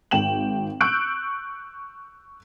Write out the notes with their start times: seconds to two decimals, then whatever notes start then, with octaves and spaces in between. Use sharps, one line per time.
0.11 G#1 G5 E7 F#7
0.81 C#6 E6 F#6 G6 D7